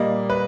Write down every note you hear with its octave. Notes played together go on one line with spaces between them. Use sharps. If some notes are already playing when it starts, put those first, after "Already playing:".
Already playing: A#2 G3 A#3 D#5
B4